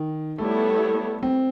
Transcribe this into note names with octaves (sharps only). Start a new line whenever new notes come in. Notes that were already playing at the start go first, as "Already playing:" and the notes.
Already playing: D#3
G3 A3 B3 E4 A4 C#5
C4